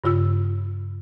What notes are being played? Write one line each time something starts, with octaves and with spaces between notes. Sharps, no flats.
G2 C#3 F4 E6